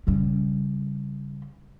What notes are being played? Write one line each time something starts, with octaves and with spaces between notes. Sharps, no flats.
C#3 G3